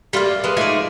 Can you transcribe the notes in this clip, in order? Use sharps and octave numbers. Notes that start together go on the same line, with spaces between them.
G3 A3 A#3 F4
G#3 A#4 B4
F3 A3 D#4 D5 G#5